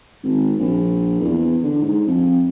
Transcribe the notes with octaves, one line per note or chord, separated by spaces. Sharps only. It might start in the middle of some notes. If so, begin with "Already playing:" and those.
G#1
A#1
E2
D3
G#2
F2